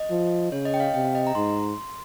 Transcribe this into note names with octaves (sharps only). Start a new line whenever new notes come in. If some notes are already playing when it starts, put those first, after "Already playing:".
Already playing: D#5
F3
C#3 C#5
D#5
G5
F5
C3 G5
D#5
A#5
G#2 C6